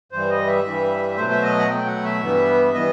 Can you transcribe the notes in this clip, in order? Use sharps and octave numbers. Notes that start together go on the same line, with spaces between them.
G2 E3 G3 C5
D#5
E5
G2 E3 G3
B2 F#3 A3 C5
E5
D#5
F#5
B2 F#3 A3 G5
F#5
E5
G2 E3 G3 B3
E3 G3 B3 D#5